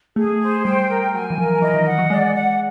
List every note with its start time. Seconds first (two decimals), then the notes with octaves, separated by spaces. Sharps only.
0.16 A3 G#4
0.41 C5
0.65 G3 G5
0.89 A#4
1.13 F#3 G#5
1.30 E3
1.38 F3 A#4
1.62 E3 D#5
1.74 D#3
1.86 F#5
1.98 F#3
2.10 G#3 D5
2.35 F#5